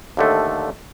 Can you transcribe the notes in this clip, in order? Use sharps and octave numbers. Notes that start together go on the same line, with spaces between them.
D#2 D3 A3